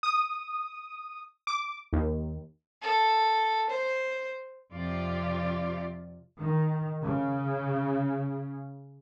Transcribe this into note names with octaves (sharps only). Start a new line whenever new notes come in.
D#6
D6
D#2
A4
C5
F2 C3 F4 D5
D#3
C#3